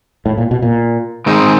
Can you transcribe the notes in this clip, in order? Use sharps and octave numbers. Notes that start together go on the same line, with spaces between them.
A2
A#2
B2
A#2
D#3 G#3 C4 D#4 G#4